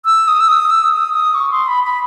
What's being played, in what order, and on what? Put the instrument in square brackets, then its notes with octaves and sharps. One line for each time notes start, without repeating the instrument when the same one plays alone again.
[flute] E6
D#6
E6
D#6
E6
D#6
D#6
C#6
C6
B5
B5